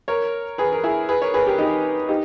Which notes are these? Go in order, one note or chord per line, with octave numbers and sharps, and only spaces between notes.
A#4 C#5
G#4 B4
A#4
E4 G#4
G#4 B4
A#4 C#5
G#4 B4
G4 A#4
D#4 G4
D#4 G4